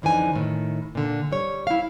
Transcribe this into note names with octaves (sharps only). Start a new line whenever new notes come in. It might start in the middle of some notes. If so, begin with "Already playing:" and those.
F2 D3 E3 D#4 G#5
A2 D#3
A#2 D3
G3 C#5
E4 F5